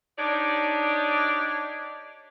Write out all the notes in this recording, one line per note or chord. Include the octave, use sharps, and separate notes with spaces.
D4 D#4 G4 C#5 D5